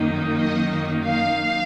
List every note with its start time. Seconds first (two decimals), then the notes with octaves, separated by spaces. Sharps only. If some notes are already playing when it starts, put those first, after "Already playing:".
Already playing: F#2 D#3 A#3 D#4
0.37 D#5
1.05 F5